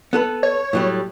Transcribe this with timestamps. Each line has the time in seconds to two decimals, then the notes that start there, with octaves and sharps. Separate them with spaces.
0.13 B3 A4 B4
0.43 C#5
0.73 A2 F#3 G3